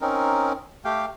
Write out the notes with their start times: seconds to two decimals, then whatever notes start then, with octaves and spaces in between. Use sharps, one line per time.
0.01 C4 C#4 D#4 A#4
0.85 A3 G4 F5 G5